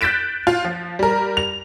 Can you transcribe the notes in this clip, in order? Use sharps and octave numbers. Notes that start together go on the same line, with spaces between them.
F#6 G6 A6 B6 D7 E7
F4
F3
G3 A#4
F7